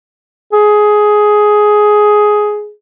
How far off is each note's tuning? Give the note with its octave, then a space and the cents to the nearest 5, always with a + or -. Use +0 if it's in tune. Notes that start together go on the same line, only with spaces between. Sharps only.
G#4 +10